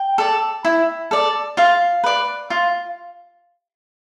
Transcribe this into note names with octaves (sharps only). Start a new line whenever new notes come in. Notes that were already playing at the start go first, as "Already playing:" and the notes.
Already playing: G5
A4 D5
E4
A4 D5
F4 F5
B4 D5
F4